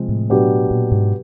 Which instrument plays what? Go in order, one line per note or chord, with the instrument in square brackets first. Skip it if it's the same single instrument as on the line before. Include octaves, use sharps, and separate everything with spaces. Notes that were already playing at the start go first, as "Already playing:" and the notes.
Already playing: [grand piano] C3 F3 G#3 C4
[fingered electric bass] A2
[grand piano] B2 F#3 B3 D4 G4
[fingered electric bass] A#2
G#2